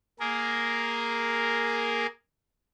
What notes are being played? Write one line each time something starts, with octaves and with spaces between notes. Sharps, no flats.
A#3 G#4 A#4